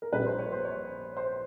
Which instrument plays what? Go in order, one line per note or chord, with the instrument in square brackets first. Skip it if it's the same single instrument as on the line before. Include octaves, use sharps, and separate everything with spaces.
[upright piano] A#4
A#1 A#2 G3 B4
C5
C#5
C5
C#5
C5